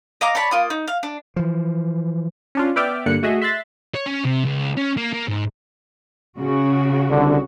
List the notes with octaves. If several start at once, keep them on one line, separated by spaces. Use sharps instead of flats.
D#5 F5 A#5 D6
C#5 D5 A5 B5
A#3 F4 D#6
D#4
F5
D4
E3 F3
C#4 D4 F4
B3 D5 E5 G5 D6 F6
G2 D3 A#3 F#6 C#7
A3 F#4 G#4 D#5 E5
E5 C6 F#6 A6 B6
C#5
C#4
C3
C#2
C#4
A#3
A#3
G#2
C#3 F#4
C2 D3